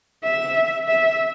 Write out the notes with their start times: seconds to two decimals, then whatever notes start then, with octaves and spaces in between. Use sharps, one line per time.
0.24 E5
0.88 E5